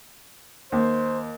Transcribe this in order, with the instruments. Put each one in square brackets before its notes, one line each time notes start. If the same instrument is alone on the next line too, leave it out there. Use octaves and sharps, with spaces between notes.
[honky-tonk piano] D#2 [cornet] C5